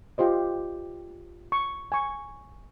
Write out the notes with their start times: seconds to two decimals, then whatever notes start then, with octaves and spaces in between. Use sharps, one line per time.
0.18 F4 G4 C5 D#5
1.52 C#6
1.92 G#5 C#6